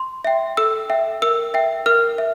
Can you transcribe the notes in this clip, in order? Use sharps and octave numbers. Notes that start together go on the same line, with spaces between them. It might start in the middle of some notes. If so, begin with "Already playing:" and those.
Already playing: C6
E5 G5
A4 E6
E5 G5
A#4 E6
E5 G5
A#4 F6
E5